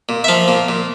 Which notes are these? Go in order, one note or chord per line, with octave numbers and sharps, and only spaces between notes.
A#2
E5
F3 F5
A#2
A#2